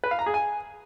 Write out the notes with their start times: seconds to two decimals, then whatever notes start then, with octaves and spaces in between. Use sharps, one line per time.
0.04 B4
0.11 F5
0.19 A#5
0.26 G#4
0.34 G#5